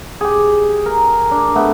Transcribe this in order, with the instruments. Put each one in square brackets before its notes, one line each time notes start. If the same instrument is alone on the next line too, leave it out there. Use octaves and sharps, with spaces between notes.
[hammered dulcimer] G4 G#4
A#4
D4
A3 B3